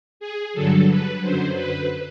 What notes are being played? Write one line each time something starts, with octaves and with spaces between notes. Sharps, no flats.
G#4
G2 D3 F#3 A4
B4
F#2 D3 F#3 C5
B4